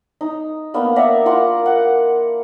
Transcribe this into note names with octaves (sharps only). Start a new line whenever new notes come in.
D#4
A#3 B3 D4
D5 E5 F#5 A#5
F4 A#4 F#5 C6
F#5